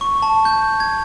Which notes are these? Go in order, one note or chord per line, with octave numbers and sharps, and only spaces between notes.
C#6
A5
G6
G#6